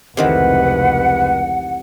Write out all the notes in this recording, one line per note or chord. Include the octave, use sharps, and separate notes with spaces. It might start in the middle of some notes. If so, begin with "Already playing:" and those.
F1 C#2 C3 D#3 E3 B4 F#5